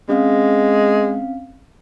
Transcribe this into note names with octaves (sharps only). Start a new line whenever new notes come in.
G#3 C4 C#4 F5